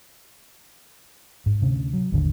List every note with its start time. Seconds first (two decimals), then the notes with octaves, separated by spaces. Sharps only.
1.46 G#2
1.61 D2 C3 C#4
1.93 F#3
2.12 G#1 D#2 A2 D3